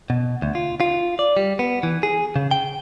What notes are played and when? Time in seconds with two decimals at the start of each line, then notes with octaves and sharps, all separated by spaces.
0.10 B2
0.42 D2
0.55 F4
0.80 F4
1.19 D5
1.37 G3
1.59 B3
1.83 E3
2.03 G#4
2.36 C#3
2.51 G5